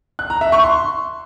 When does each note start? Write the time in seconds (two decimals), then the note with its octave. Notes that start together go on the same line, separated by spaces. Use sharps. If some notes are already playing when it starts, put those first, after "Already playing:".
0.19 F#6
0.30 A#5
0.41 E5
0.52 C#6
0.63 C6